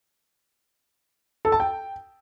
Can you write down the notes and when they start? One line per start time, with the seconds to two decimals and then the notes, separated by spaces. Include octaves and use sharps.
1.45 A4
1.52 A5
1.60 G5